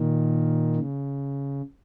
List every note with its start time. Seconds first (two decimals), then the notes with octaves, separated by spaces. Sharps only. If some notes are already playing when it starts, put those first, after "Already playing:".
Already playing: A#2 D#3
0.76 C#3